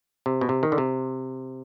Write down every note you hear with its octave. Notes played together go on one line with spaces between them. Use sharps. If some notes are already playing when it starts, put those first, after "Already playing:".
C3
B2
C3
D#3
D3
C3